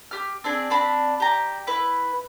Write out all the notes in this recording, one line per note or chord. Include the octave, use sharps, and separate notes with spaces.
G4 F6
C4 D4 G#4
C4 D4 B5
G4 A#5
E4 B4